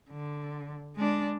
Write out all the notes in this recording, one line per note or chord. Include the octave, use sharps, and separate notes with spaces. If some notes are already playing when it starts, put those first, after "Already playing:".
D3
G#3 D4